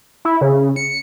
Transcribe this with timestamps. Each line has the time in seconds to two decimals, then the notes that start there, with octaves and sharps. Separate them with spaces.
0.25 E4
0.41 C#3
0.76 C#7